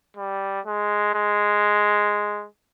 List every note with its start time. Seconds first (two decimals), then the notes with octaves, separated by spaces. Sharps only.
0.16 G3
0.66 G#3
1.15 G#3